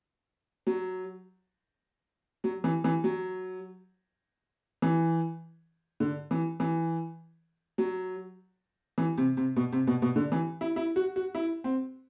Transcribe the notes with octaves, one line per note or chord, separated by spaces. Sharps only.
F#3
F#3
E3
E3
F#3
E3
D3
E3
E3
F#3
E3
C3
C3
B2
C3
B2
B2
D3
E3
E4
E4
F#4
F#4
E4
C4